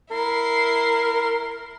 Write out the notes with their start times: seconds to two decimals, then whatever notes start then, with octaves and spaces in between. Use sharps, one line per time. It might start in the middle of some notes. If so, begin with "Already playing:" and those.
0.11 E4 A#4 C6